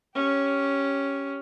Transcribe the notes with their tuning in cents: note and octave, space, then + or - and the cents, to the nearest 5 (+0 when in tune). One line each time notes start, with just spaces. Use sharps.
C#4 +0 G4 +0